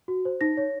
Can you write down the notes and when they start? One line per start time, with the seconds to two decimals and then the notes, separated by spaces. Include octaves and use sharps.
0.08 F#4
0.25 C5
0.41 D#4 A#6
0.57 C#5